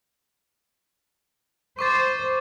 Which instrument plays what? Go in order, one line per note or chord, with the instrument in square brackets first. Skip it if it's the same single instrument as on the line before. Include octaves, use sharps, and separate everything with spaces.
[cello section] C5 [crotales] C#6 D6 A6